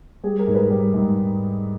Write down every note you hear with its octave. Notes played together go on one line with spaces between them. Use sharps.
G3 G#4
A#4
G#2
B4
G3
G#2